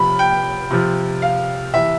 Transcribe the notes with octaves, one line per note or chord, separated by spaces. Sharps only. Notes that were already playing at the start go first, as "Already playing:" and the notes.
Already playing: C3 F3 B5
G5
C3 F3
F5
C3 E3 E5